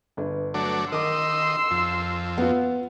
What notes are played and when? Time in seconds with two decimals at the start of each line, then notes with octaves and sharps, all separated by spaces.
0.17 G1 B4
0.54 F#3 A3 D4
0.92 D#3 A#4 D#5 C6 D6 E6
1.71 F2
2.38 B3 F4